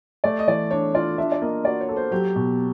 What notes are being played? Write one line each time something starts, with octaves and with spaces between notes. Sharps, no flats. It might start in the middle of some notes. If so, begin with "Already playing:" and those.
A3 D5
D#5
E3 D5
D4 C#5
F4 D5
D4 E5
D5
A#3 D#5
F#4 D5
C#5
A4
C5
F#3 G4
B2